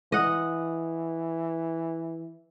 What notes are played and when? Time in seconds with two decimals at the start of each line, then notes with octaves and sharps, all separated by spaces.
0.12 E3 D#5 F#5